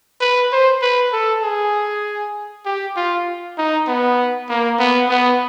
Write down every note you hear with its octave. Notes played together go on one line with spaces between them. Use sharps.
B4
C5
B4
A4
G#4
G4
F4
D#4
B3
A#3
B3
B3